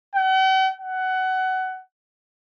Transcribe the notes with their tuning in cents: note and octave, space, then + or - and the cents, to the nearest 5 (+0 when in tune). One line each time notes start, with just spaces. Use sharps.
F#5 +45
F#5 +20